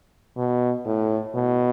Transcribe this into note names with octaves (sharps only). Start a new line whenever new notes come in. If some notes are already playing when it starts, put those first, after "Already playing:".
B2
A2
B2